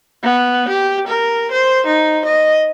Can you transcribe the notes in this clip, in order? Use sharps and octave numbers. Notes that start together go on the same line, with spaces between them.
B3
G4
A#4
C5
D#4
D#5